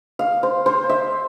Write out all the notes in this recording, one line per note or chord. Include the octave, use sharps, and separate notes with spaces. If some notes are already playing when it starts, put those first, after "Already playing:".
F5
C5
C5
E5